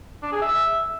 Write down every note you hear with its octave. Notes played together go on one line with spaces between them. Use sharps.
D4
G#4
E5